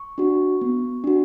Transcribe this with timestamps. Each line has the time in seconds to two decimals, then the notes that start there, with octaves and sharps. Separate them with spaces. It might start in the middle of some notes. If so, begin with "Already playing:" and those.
Already playing: C#6
0.18 D4 F#4
0.61 B3
1.04 D4 F#4